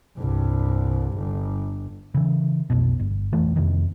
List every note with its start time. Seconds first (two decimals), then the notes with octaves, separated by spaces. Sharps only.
0.18 C2 G2
1.18 G1
2.14 C#3 E3
2.70 F1 B1 B2
2.99 G1
3.33 B1 F2 E3 A3
3.56 F2 C3 D#3